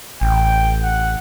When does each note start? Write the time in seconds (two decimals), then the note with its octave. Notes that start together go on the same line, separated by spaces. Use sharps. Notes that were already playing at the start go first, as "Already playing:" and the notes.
0.21 A1 G5
0.83 F#5